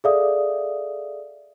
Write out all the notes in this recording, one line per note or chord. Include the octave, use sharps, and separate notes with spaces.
G#4 A4 D5 E5 F5 D#6